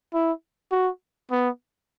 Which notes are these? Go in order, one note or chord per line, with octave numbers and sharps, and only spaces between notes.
E4
F#4
B3